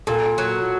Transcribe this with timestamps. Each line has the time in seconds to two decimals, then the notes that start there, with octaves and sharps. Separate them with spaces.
0.07 A#2 A4
0.38 F#3